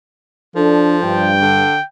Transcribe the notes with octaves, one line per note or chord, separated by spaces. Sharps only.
F3 D4 A4
G2 G5
D3